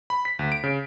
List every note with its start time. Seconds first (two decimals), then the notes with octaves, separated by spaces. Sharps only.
0.10 B5
0.25 B6
0.39 D2
0.52 D7
0.64 C#3